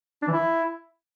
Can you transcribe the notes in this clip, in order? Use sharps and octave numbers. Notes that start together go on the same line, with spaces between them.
D4
E3
E4